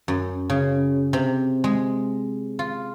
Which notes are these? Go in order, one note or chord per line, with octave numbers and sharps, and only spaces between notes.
F#2
C#3
C3
G#3
F4